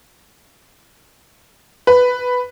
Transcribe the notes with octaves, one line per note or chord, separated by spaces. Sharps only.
B4